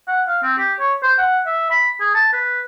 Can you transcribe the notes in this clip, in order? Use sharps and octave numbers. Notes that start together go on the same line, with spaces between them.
F#5
F5
C4
G4
C#5
C5
F#5
E5
B5
G#4
A5
B4